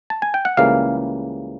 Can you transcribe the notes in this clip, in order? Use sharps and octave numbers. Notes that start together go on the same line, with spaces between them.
A5
G#5
G5
F#5
C#2 C#3 E3 G3 A#3 F5